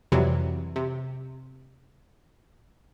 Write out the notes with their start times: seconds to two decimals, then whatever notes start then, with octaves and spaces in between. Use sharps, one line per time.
0.12 F2 C3 E3 F#3 G3
0.76 C3